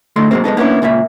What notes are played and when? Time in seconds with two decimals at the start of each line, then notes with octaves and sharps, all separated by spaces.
0.16 D2 A2 A3 D#4 C6
0.31 G#2 B2 F#3 G#3 A#3 C4
0.44 G#3 B3 D#4 A4
0.57 A#3 B3 C#4 D4 E4
0.82 C#2 A#2 A#3 E5